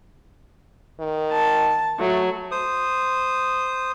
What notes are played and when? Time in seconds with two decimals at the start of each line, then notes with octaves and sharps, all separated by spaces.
1.00 D#3
1.31 A5
2.00 F#3 A3
2.51 C5 D#6